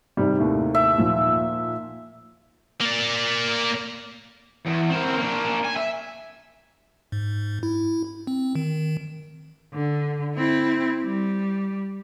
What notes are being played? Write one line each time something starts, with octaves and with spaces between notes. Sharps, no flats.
G#2 C3 D#3 G3
D#2 A2
E5
A#2 D#3 F3
A#3 D5
E2
C4 A#4
A#3 D4
G#5
E5
G#2
E4
C4
D#3
D3
C4 E4
G3